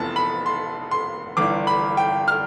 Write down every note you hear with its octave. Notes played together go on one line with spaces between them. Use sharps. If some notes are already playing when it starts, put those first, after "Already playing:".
Already playing: F1 F2 E3 B3 A5
B5
C6
C6
G1 G2 E3 D6
B5
G5
F6